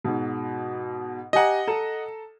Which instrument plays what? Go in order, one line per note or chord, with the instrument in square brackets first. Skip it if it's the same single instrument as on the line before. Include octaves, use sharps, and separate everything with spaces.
[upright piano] G#2 B2
[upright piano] G4 G#5 A#5 [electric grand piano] D#5 F#5
[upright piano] A4 A#5 E7